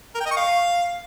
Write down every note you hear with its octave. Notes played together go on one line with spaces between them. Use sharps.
A#4
G5
D#5
C#6
F5